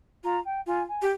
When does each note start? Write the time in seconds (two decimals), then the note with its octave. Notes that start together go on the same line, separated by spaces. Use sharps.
0.24 F4 A#5
0.45 G5
0.67 F4 G#5
0.88 G#5
1.02 G4